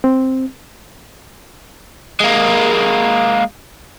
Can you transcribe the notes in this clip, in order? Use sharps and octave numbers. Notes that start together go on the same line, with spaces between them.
C4
G#3 A#3